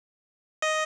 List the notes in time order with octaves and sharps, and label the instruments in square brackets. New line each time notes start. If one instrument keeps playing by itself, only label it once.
[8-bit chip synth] D#5